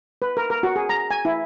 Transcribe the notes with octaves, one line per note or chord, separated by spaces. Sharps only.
B4
A#4
A#4
F#4
G#4
A#5
G#5
E4